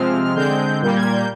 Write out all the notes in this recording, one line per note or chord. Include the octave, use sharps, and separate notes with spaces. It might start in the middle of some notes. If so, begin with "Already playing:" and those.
Already playing: C3 F3 G#3 C4 F6
D3 G#3 C4 G6
A#2 G3 A#3 G6
G#6
G6